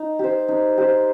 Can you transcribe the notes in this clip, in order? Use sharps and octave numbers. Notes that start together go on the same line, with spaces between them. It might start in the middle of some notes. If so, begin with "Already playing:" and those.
Already playing: D#4
G4 C5
D#4
G4 C5